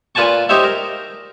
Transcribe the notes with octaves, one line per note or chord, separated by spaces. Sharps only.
A#2 F4 B4 G#5 A5 C#6
D#4 G4 C5 C#5 E5
A#4